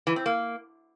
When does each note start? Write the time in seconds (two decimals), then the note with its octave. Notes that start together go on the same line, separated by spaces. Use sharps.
0.07 E3
0.16 C4
0.26 A#3